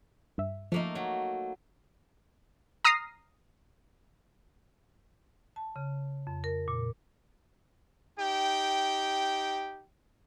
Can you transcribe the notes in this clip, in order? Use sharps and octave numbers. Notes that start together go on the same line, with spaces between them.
G2 E5
F3 A3 A#3 D#4
F#3
A#5 D#6 F6 A#6 C7
A5
C#3
F2
A#4
A#2
D#4 G4 G5